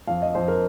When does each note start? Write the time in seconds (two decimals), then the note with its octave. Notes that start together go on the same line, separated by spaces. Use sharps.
0.07 F2 F5
0.22 D#5
0.35 F2 C5
0.48 A#4